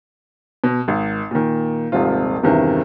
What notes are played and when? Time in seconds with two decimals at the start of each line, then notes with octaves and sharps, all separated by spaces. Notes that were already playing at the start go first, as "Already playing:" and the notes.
0.64 B2
0.88 G#1
1.31 A#2 D#3
1.92 D#1 G#1 C3 F3 F4
2.43 E2 G2 C3 D#3 E3